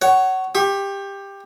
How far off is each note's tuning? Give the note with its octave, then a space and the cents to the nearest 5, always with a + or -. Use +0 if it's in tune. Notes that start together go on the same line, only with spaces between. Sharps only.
C#5 +0 F#5 +25
G4 +15 C#6 -35